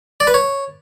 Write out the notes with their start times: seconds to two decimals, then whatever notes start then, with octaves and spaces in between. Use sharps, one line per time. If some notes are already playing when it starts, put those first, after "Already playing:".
0.20 D5
0.27 B4
0.34 C#5